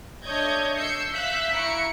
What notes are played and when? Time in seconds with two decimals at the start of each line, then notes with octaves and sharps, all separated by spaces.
0.24 A3 D4 C#5 D#5 G6 G#6
0.76 E6 G6 C7 C#7
1.12 E5 F5 E6 F#6 G6 B6
1.53 E4 A#5 C#6 C#7 D7